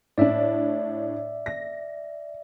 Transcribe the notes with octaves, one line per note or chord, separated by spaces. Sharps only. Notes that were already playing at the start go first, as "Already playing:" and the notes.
A2 D4 D5 E5
A#6